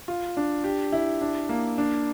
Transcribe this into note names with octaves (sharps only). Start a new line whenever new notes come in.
F4
D4
G4
E4
D4
A#3
D4